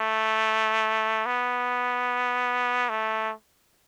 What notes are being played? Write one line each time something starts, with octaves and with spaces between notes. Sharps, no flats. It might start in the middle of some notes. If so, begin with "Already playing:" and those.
Already playing: A3
B3
A3